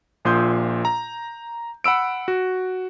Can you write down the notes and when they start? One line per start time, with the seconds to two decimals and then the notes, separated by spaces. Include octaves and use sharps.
0.25 A#1 A#2 C6 D#6 G6
0.85 A#5
1.84 F#5 B5 E6 D7
2.28 F#4